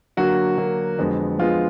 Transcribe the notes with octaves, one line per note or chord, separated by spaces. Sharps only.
D3 F#3 A#3 F#4
D3 F#3 A#3
F2 D3 G#3 B3
F2 D3 G#3 B3 F4